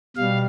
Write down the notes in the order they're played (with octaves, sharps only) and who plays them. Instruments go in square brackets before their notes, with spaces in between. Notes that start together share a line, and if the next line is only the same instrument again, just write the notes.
[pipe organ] B2 G3 F5